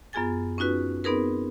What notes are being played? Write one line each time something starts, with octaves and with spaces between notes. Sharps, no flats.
F#2 B3 F4 G#4 G#5 A6
C#4 D#4 F4 F#4 B4
B3 C4 D#4 G#4 A#4 B4